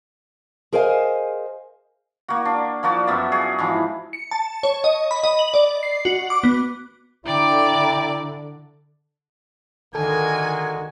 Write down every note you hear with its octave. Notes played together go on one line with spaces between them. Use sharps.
G#4 A#4 C5 D#5 F5 G#5
A#3 F#4
D4
F3 A#3 F#4 D5
F#2 B3 E5 A5
F#4 G#4
G#2 E3 F3
C#7
A5
C#5
D#5
B5
D#5
F#7
D5
C7
F#4
D6
B3
D3 E4 D5 G5 A#5 D6
D3 D#3 G#3 A#3 F#4 A4 A#4 G#5